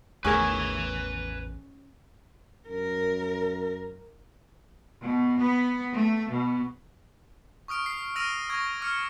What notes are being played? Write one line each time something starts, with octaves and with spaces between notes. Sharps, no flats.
A1 E2 A3 C#4 G#4 A#4 B4 G#5
F#2 A#4
B2
B3
A3
B2
C#6 D#6 F6 D7
C7
E6 F6 A#6 D7 D#7 F7
C#6 E6 G#6 A#6
D6 F6 C#7